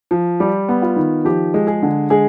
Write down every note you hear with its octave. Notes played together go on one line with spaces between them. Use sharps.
F3
G3 G4
B3
F4
D#3
F3 G4
G#3
G#4
D3
G#3 G#4